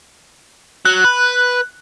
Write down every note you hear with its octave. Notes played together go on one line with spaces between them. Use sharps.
F#3 F#6
B4